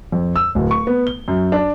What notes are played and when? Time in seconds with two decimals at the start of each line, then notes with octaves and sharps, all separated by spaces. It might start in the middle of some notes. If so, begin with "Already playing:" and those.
0.12 F2
0.36 E6
0.55 D1
0.71 C#6
0.87 B3
1.07 G7
1.28 F#2
1.52 D4